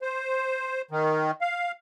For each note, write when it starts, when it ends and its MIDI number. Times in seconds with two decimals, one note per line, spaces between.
0.02 0.82 72
0.91 1.31 51
1.41 1.71 77